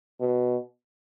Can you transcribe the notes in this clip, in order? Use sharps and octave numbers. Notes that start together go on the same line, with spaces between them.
B2